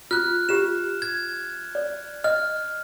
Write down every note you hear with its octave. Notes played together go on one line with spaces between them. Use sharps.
F4 F6 F#6
F4 G4 E7
G#6
D5
D#5 F6